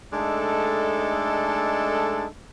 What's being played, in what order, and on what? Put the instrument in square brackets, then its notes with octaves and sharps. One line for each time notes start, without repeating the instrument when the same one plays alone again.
[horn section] G#3 A3 D4 D#4 A4